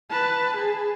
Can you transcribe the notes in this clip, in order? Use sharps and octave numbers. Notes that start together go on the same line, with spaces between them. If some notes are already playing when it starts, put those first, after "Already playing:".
B4 A5
G#4